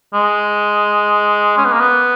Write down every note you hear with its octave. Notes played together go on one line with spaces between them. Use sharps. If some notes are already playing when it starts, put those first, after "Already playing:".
G#3
C#4
B3
A#3
B3